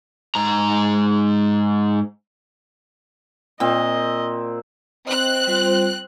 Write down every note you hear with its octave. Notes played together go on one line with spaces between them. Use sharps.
G#2 A#5
A#2 C4 D#5
C4 D#5 F#6
G3 F4 C5